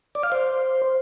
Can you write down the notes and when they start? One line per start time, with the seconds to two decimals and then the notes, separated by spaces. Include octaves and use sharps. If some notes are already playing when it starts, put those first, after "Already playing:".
0.15 D5
0.23 F5
0.32 C5